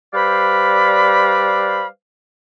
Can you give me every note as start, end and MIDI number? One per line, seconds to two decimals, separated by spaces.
0.14 1.86 55
0.14 1.86 71
0.14 1.86 72
0.14 1.86 74
0.14 1.86 77
0.14 1.86 83